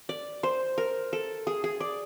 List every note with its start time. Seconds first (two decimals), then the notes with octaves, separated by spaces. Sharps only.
0.09 D5
0.43 C5
0.78 A#4
1.13 A4
1.47 G#4
1.64 G#4
1.80 D5